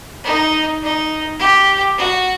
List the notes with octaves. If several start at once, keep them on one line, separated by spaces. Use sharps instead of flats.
D#4
D#4
G4
F#4